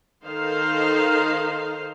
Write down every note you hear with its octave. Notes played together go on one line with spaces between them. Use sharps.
D#3 D#4 A4 C5 F5